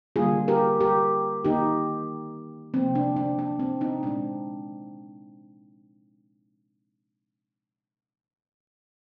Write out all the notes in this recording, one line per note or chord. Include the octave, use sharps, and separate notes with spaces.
D3 G3 A#3 F4 G#4
G4 A#4
G4 A#4
D#3 A#3 D#4 G4
C3 F3 A#3 C4
D4
D4
D4
C4
C4 D#4
A#2 G#3 C4 D4